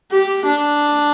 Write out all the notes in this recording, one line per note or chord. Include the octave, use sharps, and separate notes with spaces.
G4
D4